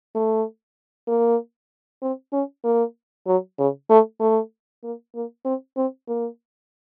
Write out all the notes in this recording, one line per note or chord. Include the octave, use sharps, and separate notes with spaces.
A3
A#3
C4
C#4
A#3
F#3
C#3
A3
A3
A#3
A#3
C4
C4
A#3